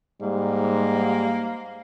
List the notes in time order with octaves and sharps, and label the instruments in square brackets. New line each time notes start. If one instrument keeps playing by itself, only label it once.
[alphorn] G#2 [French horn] G3 [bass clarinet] A#3